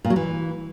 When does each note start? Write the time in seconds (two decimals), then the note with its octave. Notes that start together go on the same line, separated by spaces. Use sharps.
0.05 A#2
0.10 F#3
0.16 E3